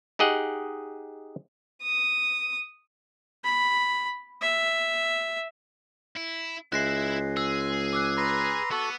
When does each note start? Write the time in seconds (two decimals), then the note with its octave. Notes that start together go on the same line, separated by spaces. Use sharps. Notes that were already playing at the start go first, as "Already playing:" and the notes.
0.19 D#4 G4 G#4 D#5 F#5
1.83 D#6
3.44 B5
4.41 E5
6.16 E4
6.72 C#2 G#3 E4 E5 F#6 A#6 C7
7.37 G#4 E6
7.93 D6 E6 F#6
8.17 B4 A#5 C6
8.71 B3 F#4 A4